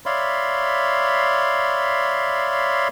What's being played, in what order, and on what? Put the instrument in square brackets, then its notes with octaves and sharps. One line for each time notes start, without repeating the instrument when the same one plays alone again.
[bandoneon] C#5 D5 E5 F5 B5 C6